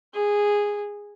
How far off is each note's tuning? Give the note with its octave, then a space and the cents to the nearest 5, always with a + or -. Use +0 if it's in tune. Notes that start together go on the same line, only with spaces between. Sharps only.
G#4 -10